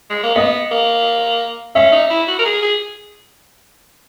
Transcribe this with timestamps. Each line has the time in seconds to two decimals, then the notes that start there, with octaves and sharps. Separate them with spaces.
0.10 G#3
0.23 A#3
0.35 B3 D#5
0.71 A#3
1.75 C#4 E5
1.92 D#4
2.10 E4
2.28 F#4
2.39 A#4
2.45 G#4
2.62 G#4